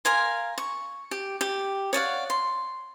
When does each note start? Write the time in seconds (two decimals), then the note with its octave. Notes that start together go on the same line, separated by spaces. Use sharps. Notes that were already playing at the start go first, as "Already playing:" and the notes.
0.05 A#4 F5 G#5 C6
0.58 C#6
1.11 G4
1.41 G4
1.93 C#5 D5 F5 F#5
2.30 C6